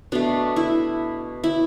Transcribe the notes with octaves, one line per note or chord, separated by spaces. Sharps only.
B2 A3 D4
E4
E4